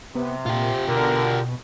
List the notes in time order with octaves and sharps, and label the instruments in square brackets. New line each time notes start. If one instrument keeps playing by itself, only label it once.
[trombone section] C3 [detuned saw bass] B3
[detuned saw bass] A#2 [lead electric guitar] F4 G4
[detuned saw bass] B2 [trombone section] D3 A#4